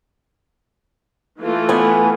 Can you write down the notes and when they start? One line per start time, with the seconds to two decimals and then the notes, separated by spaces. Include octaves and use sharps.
1.40 E3 A3 F4
1.69 B3 G#5